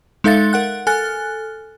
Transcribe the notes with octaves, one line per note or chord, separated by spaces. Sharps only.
G#3 D#4 A4 E5 F5 A6
A#4 F#5 F#6
A4 G#5 F6 F#6 A6